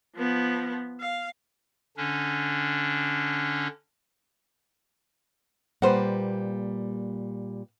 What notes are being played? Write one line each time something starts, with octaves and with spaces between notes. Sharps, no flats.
F3 B3
F5
D3 C#4 D4
A#2 G3 A#3 B4 C5 F#5